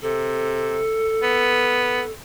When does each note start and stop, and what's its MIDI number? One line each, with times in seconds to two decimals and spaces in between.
0.02 0.82 48
0.02 2.11 69
1.22 2.02 59